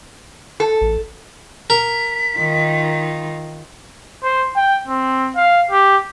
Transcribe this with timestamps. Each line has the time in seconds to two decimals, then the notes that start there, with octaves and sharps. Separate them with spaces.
0.60 A4
0.81 A1
1.70 A#4 B6
2.38 D#3 D#4 F4
4.23 C5
4.56 G5
4.87 C4
5.36 F5
5.71 G4